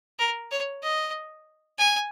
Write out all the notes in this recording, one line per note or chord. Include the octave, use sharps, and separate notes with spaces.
A#4
C#5
D#5
G#5